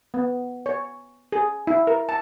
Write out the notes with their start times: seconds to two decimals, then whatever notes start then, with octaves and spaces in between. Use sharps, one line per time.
0.14 B3
0.66 C#5
1.32 G#4
1.67 E4
1.87 A#4
2.09 A5